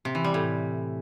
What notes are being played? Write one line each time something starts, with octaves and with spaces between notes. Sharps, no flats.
C3
E3
G3
A2